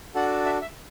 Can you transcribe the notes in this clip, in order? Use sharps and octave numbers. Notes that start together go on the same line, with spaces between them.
D4 F#4 A4 F#5
E5
E5